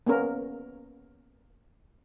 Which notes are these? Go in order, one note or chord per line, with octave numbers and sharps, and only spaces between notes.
A#3 B3 C#4 A#4